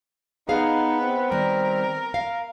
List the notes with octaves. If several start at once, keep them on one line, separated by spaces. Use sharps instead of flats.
B3 D#4 G#4 F5
C4
D#3 G3 A#4
F5